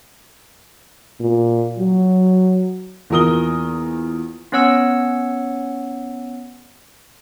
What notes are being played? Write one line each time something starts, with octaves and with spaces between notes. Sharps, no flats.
A#2
F#3
E2 A#2 A#4 D#6 G7
B3 C#4 C#5 F#5 E6